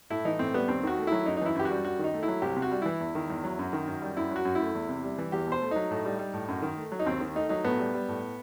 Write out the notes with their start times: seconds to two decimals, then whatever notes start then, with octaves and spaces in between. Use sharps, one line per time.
0.10 A2 E4
0.25 E3 D#4
0.39 A2 C4
0.54 G3 B3
0.68 D#2 C4
0.83 D#3 F#4
0.98 A3
1.07 F#3 E4
1.26 F#2 D#4
1.37 D#4
1.42 E3 E4
1.55 F#2 G4
1.65 F#4
1.70 G3
1.84 F#2 F#4
1.99 D#3 D#4
2.14 A3
2.23 E4
2.28 F#3
2.42 C2 G4
2.56 C3
2.62 F#4
2.71 G3
2.82 E3 E4
3.00 E2
3.15 D#3
3.30 E2
3.44 F#3
3.59 F#2
3.73 D#3
3.87 F#2
4.02 G3
4.17 F#2 E4
4.31 F#3
4.36 F#4
4.45 F#2
4.55 E4
4.60 A3
4.75 E2
4.89 C3
5.04 G3
5.18 E3
5.32 E2 G4
5.46 B2
5.52 C5
5.61 A3
5.71 F#3 D#4
5.91 A2
6.05 G3
6.19 G3
6.34 A2
6.48 F#2
6.62 D#3
6.77 A3
6.92 F#3
6.99 D#4
7.06 D#2 C4
7.21 D#3
7.35 A3 D#4
7.49 F#3 D#4
7.64 A2 B3
7.79 G3
7.94 G3
8.08 A2